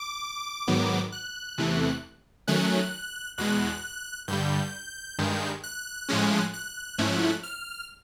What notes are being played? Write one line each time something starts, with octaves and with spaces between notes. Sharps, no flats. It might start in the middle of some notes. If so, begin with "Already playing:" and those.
Already playing: D6
G#2 D#3 F#3 B3
F#6
E2 C3 E3 A3
D#3 F#3 A3 C#4 F#6
E2 B2 G#3 F#6
G2 D3 G3 G6
G2 D#3 G#3
F#6
A2 F3 G#3 C#4
F#6
G#2 F3 A3 C#4 E4
F6